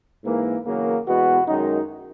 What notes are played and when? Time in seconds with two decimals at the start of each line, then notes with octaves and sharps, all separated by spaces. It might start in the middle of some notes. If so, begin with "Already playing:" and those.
0.24 G#2 E3 A#3
0.65 E2 C#3 F#3 A#3
1.06 E2 B2 G#3 B3 F#4
1.47 F#2 D#3 G#3 D#4